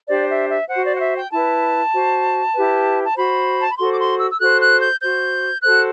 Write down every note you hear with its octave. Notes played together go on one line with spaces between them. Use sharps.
D4 G4 C5 D5
E5
E5
F#4 C5 F#5
D5
F#5
E5
G5
E4 B4 A5
F#4 C5
E4 G4 B4
A5
F#4 C5 B5
A5
B5
F#4 A4 C5 C6
D6
C6
E6
E6
F#4 A4 C5 F#6
F#6
G6
F#4 C5 G6
F#4 A4 C5 F#6